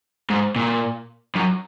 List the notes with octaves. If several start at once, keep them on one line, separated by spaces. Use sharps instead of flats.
G#2
A#2
F#2